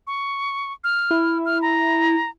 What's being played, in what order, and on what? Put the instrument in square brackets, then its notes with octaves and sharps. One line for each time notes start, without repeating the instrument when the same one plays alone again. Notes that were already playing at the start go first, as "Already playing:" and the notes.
[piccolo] C#6
F6
[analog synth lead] E4
[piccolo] F6
A#5